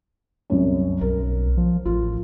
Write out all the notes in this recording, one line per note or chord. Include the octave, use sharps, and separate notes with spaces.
C2 F#2
B1 A#4
F3
A1 F4